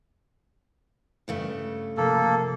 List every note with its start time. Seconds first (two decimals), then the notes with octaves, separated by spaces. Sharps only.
1.28 G2 C#3 A3
1.97 C3 F3 A#3 A4